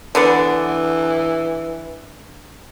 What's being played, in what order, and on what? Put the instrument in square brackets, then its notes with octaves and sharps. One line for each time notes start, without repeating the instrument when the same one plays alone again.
[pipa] D3 B3 D4 [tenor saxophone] E3